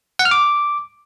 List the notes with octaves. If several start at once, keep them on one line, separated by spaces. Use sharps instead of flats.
F#5
F6
D6